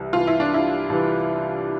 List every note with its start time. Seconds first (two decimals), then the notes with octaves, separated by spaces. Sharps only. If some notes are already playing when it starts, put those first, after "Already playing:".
Already playing: C2 C3 E3
0.13 C2 C3 E3 F4
0.27 E4
0.40 D4
0.54 E4
0.89 C2 C3 E3